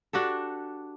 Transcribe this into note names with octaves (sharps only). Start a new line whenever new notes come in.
D4 F#4 G4 A4